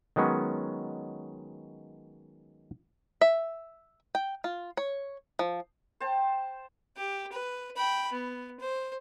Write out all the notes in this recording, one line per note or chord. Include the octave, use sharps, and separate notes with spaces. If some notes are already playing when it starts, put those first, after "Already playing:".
D#3 F#3 G#3 B3 C#4
E5
G5
F4
C#5
F3
C5 G5 A5
G4
B4
G5 B5
B3
C5